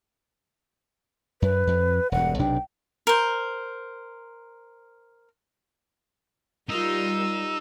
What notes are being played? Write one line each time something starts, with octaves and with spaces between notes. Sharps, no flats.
F#2 B4
F2
E1 G2 F#5
B1 C3 D4 G5
A#4 C5
G3 D#4 F4 A#4 E6